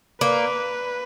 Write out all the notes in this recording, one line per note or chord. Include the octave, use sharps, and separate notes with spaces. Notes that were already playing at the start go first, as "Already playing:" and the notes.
A#3 B4